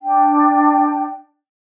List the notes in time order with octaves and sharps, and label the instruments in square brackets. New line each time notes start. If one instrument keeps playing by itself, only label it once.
[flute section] D4 G5